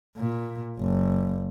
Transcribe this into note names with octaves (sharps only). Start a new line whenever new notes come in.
A#2
F#1